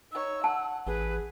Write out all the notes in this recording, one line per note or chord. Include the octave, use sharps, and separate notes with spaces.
D#4 C#5 E6
F#5 A5
A1 G#4 B4